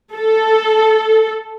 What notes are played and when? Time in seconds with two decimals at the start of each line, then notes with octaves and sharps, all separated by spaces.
0.15 A4